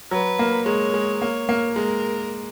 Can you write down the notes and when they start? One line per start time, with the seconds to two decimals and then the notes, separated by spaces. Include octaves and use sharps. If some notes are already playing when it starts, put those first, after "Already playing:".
0.11 F#3 B4
0.39 A#3
0.66 G#3 C#5
0.94 G#3
1.21 A#3 C#5
1.49 A#3
1.76 G#3 A#4